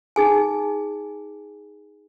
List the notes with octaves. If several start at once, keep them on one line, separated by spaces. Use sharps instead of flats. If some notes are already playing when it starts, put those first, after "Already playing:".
D#4 G#4 G#5